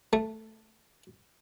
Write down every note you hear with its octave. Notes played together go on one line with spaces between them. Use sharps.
A3